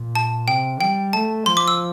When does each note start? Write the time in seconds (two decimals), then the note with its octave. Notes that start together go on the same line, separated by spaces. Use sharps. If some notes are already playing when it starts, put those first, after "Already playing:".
Already playing: A#2
0.15 A5
0.47 C3 G5
0.81 G3 G5
1.13 A3 A5
1.45 F3 C6
1.57 D6
1.68 E6